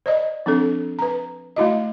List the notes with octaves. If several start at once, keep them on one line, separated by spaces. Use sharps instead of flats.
C5 D5 D#5
F3 C4 D4 A4
B4 A#5
A3 E4 F#4 D#5